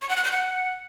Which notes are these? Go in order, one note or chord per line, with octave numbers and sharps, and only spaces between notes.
C#6
F#5
F#6
G6
F#5